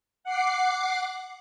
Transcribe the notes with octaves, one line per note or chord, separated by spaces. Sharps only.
F#5 D6 C7